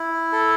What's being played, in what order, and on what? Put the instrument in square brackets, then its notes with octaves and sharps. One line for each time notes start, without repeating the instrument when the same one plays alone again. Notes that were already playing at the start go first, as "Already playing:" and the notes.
Already playing: [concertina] E4
A4